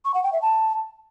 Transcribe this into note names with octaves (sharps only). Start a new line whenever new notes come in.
C#6
F#5
G5
E5
A5